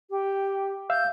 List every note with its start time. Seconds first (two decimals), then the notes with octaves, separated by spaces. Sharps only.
0.10 G4
0.90 E5 F5 E6 G6